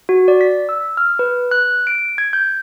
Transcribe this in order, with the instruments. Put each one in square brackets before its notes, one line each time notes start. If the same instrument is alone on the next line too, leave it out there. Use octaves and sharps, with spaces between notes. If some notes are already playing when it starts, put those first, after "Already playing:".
[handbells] F#4
D5
B6
E6
F6
B4
F#6
D7
G#6
G6